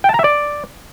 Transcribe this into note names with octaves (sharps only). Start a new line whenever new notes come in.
G5
A5
A#5
E5
D5